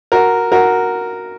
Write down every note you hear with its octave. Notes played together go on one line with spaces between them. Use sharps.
F#4 A#4
F#4 A#4